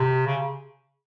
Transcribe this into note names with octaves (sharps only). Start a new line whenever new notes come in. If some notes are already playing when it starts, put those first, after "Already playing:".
Already playing: C3
C#3